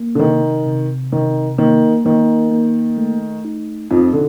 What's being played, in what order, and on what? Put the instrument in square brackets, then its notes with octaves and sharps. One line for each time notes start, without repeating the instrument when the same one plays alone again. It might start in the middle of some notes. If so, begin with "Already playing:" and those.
Already playing: [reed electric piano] A#3
[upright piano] D3
[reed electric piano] C3 [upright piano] D#3
[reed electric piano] C3
[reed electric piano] C3 [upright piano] D#3
[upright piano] D#3 [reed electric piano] A#3
[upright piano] D#3 [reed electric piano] A#3
[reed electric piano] A#3
A3
D#4
[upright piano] F2 F3 [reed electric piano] D#4
[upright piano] D3